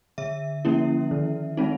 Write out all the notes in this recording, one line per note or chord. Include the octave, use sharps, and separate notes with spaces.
D3 E5
F3 A#3 C#4 E4
D#3
G#3 C4 D#4